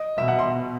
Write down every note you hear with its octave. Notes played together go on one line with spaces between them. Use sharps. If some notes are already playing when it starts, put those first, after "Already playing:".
Already playing: D#5
B2 E5
F#5
C6